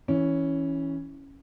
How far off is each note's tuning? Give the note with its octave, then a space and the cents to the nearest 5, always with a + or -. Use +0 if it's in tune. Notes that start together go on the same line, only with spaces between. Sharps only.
E3 -15 C#4 +0